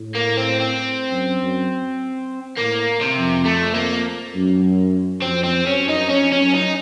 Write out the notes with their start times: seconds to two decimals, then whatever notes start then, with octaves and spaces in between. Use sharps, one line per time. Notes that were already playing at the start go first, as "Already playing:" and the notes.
Already playing: A2
0.15 A#3
0.37 C4
0.60 C4
1.11 F#2
1.40 F#2
2.57 A2 A#3
3.01 C3
3.17 F2
3.45 A3
3.75 A#3
4.34 F#2
5.22 F2 C4
5.44 C4
5.66 F#2 C#4
5.89 D#4
6.10 F2 C#4
6.32 C#4
6.39 F#2
6.54 D#4